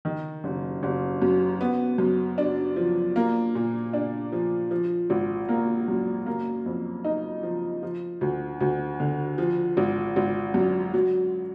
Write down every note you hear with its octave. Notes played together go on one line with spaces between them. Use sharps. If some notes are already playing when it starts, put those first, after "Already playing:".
D#3
F#1
F#1
F#2
B3
F#2
D4
F3
A#3
A#2
D4
F3
F3
G#1
A#3
F#2
A#3
F2
D#4
F3
F3
D2
D2
D3
F3
G#1
G#1
F#2
F#3